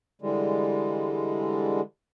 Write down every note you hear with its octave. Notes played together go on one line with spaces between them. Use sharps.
D3 E3 G3 G#3